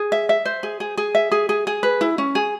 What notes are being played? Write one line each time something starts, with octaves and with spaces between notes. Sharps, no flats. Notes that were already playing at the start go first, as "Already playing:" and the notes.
Already playing: G#4
E5
E5
C5
G#4
G#4
G#4
E5
G#4
G#4
G#4
B4
E4
C#4
G#4